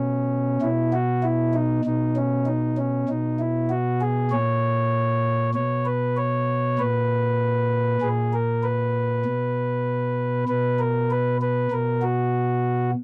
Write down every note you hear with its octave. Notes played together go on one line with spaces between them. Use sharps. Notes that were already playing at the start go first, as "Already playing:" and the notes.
Already playing: B2 C#4
B2 E4
F#4
E4
D#4
B2 D#4
C#4
D#4
C#4
B2 D#4
E4
F#4
G#4
A#2 C#5
B2 C#5
B4
C#5
A#2 B4
A#2 G#4
A#4
B4
B2
B2 B4
A#4
B4
B4
B2 A#4
F#4